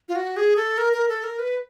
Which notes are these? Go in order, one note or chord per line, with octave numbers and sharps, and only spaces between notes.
F4
F#4
G#4
A4
A#4
A#4
A4
A#4
B4